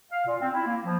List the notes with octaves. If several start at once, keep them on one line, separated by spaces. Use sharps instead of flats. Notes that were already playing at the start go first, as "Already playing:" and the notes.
F5
A#2
C4
E4
A#3
F3